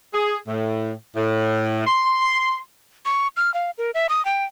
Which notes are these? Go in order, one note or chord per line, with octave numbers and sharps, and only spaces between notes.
G#4
A2
A2
C6
C#6
F6
F5
A#4
E5
D#6
G5